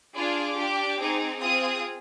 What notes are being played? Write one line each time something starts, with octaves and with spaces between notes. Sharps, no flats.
D4 F4 G#4 D6
D4 G4
C4 D#4 G#4
C4 F4 G#4 D#6